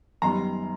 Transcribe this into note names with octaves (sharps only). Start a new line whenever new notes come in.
F#2 D#3 G3 B3 A#5 C6